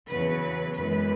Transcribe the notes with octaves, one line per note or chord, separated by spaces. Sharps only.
E2 C#3 F#3 B4
F#2 E3 G#3 B4